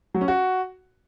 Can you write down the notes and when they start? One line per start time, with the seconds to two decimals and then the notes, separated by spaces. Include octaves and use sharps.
0.14 F#3
0.21 C#4
0.28 F#4